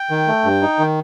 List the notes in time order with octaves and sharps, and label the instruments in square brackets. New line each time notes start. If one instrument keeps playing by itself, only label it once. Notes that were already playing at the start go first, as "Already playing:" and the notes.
Already playing: [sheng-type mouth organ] G5
[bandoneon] D#3
A3
G2
D#4
D#3